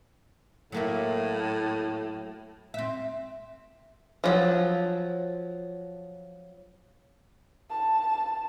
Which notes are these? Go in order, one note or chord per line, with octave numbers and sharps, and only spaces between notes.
A2 F#3 A#3 E4
C4 E5
F3 F#3
A5